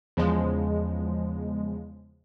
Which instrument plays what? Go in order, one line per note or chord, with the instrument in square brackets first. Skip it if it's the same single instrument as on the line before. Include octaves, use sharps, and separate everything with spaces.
[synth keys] E2 C#3 F3 G#3